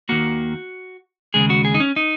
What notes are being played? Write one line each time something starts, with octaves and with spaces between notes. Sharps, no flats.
D#2 D#3 A#3 F#4
D#2 C#3 G#3 G#4
F#4
G#4
D#4
C#4
D#4